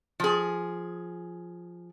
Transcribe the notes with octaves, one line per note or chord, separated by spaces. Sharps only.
F3 G#4